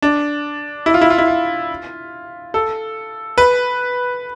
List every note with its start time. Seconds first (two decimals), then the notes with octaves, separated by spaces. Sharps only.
0.02 D4
0.86 E4
0.94 F4
1.01 E4
1.10 F4
1.18 E4
1.27 F4
2.54 A4
3.38 B4